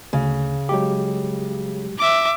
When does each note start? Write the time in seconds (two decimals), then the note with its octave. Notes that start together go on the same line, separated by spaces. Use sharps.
0.13 D2 C#3
0.69 F#3 G#3 G4
1.98 E5 D6